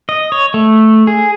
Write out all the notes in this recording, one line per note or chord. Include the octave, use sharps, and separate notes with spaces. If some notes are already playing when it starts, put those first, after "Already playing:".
D#5
C#5
A3
G#4